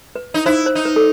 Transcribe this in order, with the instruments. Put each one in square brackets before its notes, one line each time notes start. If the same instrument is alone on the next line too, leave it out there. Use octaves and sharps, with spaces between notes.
[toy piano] B4
[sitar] D#4
[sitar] E4 [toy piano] C5
[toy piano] C5
[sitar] D#4
[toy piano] B4
A4